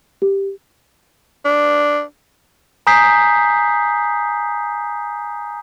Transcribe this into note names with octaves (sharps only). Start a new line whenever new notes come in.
G4
D4
G#5 A#5 D#6 G6 B6 C7